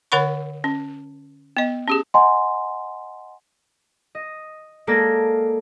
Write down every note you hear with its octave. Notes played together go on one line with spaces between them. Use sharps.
D3 A#4 C#5 F#5 B5 C#6
C#4
B3 D#5
C#4 G4 G#4
D#5 F#5 G#5 A#5 C6
D#5
G#3 A#3 A4 D5 G#6 A#6